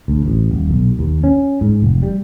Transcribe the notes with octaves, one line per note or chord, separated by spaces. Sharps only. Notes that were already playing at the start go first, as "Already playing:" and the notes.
D2
A1
D#1
B1
D#2
C#4
G#2
F1
G3